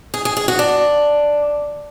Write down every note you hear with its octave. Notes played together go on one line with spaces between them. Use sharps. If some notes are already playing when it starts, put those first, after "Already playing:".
G#4
G#4
G#4
F#4
D4